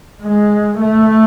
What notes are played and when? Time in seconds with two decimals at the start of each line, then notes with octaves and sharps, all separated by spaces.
0.22 G#3
0.80 A3